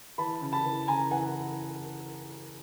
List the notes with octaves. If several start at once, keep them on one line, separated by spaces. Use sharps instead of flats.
E3 A5 B5
C#3
A5 B5
E3
C#3 G#5 A#5
E3 F#5 G#5